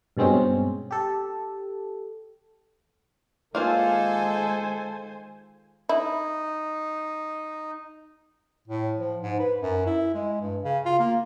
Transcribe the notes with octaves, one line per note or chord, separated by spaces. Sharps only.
G2 B2 G#3 C4 C#4
G4 A4
D#3 G#3 A#3 F4 A4 C5 G#5
D#4 E4
A2
F3
G#2
B4
F#2
E4
G#3
G2
C#3
F4
A#3